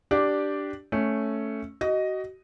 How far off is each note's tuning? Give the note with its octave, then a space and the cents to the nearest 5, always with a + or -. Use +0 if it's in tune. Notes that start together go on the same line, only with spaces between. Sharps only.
D4 +0 G4 -10 D5 +0
A3 +0 C#4 +0
F#4 +30 D#5 +0